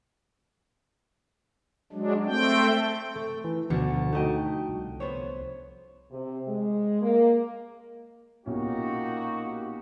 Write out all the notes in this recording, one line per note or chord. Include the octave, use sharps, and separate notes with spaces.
F#3 G#3 D4
A3 C4 G5
A3
E3
D2 B2 F3 C#7
A3 D#4 F#4 D#5 G5
C2
B3 C5 C#5
C3
G#3
A#3
B1 A#2 A#3 C#4 D#4 F#4 G4